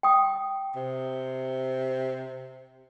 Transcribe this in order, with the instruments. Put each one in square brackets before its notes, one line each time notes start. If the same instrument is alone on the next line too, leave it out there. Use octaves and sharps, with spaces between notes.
[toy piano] G5 D#6
[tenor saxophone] C3